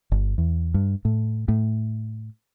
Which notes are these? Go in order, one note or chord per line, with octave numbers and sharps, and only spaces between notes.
G1
E2
G2
A2
A2